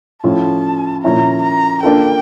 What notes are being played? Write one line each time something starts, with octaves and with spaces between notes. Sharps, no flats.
A2 F3 C#4 F4 A5
A#2 F3 C#4 E4 A#5
A#5
A#3 D4 F4 A4 G5